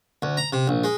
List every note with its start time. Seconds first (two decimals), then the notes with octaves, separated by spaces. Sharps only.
0.22 D2
0.37 A#5
0.53 C3
0.68 A#1
0.84 G#3